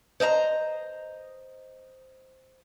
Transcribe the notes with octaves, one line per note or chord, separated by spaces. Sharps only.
C5 D#5 E5 A#5